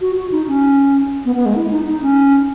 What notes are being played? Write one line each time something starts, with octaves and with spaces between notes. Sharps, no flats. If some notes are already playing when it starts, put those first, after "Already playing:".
F#4
F#4
D#4
C#4
B3
B3
G#3
E4
D#4
D#4
C#4